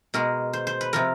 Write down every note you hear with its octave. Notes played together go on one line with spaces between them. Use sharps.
B2 G#3 A#4
C5
C5
B4
C3 F3 A#4